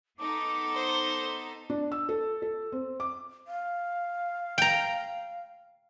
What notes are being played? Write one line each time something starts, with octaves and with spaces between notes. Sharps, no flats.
B3 D#4 A4 D6
C5
D4
E6
A4
A4
C4
D6
F5
G5 A#5